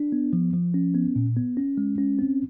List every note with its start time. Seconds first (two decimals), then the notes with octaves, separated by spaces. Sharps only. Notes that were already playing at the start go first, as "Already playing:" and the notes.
Already playing: D4
0.12 B3
0.33 F3
0.53 F3
0.74 C#4
0.95 B3
1.16 A#2
1.36 B3
1.57 C#4
1.78 G#3
1.98 C#4
2.19 C4